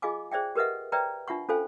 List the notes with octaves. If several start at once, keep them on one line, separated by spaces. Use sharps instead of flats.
F4 G#4 D#5 F5 G#5 D6
G#4 C5 D5 E5 G5
G4 A#4 B4 D#5 E5 F#5
B4 C5 D5 E5 G5 A#5
D4 F4 E5 F#5 C#6
C#4 F4 A4 C5 F5 G#5